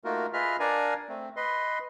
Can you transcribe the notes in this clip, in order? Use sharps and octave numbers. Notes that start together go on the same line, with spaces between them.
A3 A#3 D#4 F4 F#4 A#4
F4 G#4 B4 D#5 E5 F6
D4 A#4 D5 F5 G#5 A#5
A3 C4
B4 D#5 C6